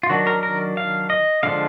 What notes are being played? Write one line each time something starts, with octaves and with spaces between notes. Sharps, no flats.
F4
D#3 F#3 D4 F#4
A#4
A#4
F5
D#5
D3 F3 G#3 D4 F5